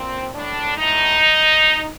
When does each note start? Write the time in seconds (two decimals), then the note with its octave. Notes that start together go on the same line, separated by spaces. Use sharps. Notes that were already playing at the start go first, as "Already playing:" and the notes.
Already playing: A#2 C4
0.33 A2 D4
0.77 A2 D#4